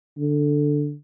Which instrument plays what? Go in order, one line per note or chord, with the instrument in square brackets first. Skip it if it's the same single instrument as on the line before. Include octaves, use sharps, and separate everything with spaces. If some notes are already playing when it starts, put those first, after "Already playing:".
[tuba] D3